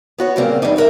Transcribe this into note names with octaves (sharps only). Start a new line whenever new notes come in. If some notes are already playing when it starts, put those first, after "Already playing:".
B3 F#4 C#5
A#2 C#3 G3 A#3 C4
E2 E3 G3 B3 D4 D#4
F2 G#2 D#4 A#4 E5